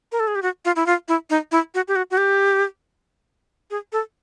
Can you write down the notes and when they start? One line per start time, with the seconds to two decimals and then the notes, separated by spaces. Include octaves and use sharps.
0.12 A#4
0.20 A4
0.27 G#4
0.35 G4
0.42 F#4
0.65 F4
0.76 E4
0.86 F4
1.08 E4
1.30 D#4
1.52 E4
1.74 F#4
1.88 G4
1.96 F#4
2.11 F#4
2.17 G4
3.71 G#4
3.92 A4